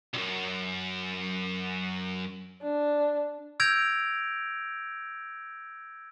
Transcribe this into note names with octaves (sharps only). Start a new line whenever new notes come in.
C2 F#2
D4
E6 G6 G#6 A#6 D7 F7